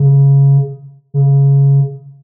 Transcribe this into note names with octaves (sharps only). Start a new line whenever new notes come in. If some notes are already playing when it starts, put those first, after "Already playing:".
Already playing: C#3
C#3